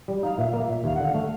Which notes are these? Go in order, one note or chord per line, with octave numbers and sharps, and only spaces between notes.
G3
D#4 F5
A#2 E5
A#3 F5
E5
A#2
D#2 F5
D3 F#5
F5
A3